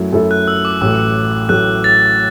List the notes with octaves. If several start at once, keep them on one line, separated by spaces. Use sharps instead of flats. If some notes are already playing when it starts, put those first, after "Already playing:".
Already playing: F#2 F#3 A3 E4
F#2 F#3 A3 E4 A4
F#6
E6
D6
A1 A2 F#3 A3 E6
A1 A2 F#3 A3 F#6
A6